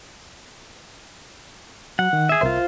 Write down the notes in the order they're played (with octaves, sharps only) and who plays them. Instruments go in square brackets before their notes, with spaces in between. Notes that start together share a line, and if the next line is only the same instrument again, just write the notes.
[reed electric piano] F#3 [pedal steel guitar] F#5
[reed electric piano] D#3
[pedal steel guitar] G#4 E5
[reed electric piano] C2 A#4 E5 [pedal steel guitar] F4 C5